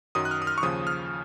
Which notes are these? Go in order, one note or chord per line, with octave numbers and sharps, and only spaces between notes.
F#2 D#3 F#3 D#6
F#6
F6
D#6
F6
C#6
D#2 C#3 F3 D#6
F6